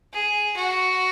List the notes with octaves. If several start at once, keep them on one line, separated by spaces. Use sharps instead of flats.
G#4
F#4